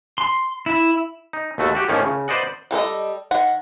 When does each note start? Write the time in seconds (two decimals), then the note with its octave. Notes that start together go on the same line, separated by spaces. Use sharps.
0.18 C6
0.66 E4
1.33 D#4
1.58 D#2 B2 A3 F#4
1.75 F#4 G4
1.89 A2 D#3 F3 A#3 C#4 D#4
2.03 C#3
2.28 B4 C5 D5 D#5 F#5
2.71 G3 A4 B4 D#5
3.31 D#3 F#5